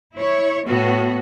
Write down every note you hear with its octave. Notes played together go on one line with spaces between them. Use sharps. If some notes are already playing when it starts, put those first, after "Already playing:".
E4 C#5
A2 B3 F#4